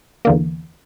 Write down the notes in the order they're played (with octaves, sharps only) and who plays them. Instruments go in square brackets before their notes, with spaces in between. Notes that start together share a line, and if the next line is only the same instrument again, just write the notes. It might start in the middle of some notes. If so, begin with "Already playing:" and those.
[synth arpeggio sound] E2 D3 A#3